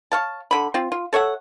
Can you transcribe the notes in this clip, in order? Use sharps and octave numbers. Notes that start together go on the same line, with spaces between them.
C#5 F5 A5
D3 B5
C4 F4
F4
A4 C#5 E5 F#5